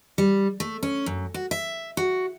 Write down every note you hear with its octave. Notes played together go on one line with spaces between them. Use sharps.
G3
A3
C#4
F#2
F#4
E5
F#4